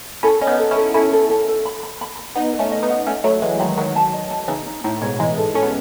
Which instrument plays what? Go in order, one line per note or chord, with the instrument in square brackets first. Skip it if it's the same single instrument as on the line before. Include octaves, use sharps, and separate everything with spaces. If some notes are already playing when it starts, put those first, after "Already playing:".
[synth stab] C#4 E4 [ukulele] A4
[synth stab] C#4 [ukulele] D#5
[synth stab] B3 D#4
[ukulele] A4
[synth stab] C#4 E4
[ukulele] A4
[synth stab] C#4 E4 [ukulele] A4
[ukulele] A4
A4
A4
B5
B5
B5
B5
[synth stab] B3 D#4 [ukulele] D#5
[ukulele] B4
[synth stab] A3 C#4
[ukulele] D#5
[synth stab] B3 D#4
[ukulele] F#5
[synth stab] A3 C#4 [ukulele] E5
[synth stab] F#3 A3 [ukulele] B5
[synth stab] E3 G#3 [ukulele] E5
[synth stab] D#3 F#3 [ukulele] B5
[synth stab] D#3 F#3 [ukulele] B4
[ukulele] A5
D#5
A5
[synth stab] C#3 E3 [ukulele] D#4
[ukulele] D#4
[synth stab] A2 [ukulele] D#4
[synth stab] G#2 B2 [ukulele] C#5
[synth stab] E3 G#3 [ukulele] D#4
[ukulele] A4
[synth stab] C#4 [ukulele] A4
[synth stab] B3